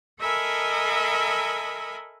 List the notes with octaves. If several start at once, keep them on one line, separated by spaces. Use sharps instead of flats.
A4 A#4 D#5 E5 G#5 B5